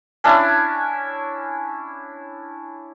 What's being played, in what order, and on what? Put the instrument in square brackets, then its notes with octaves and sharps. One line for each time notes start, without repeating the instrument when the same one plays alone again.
[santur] C#4 D4 E4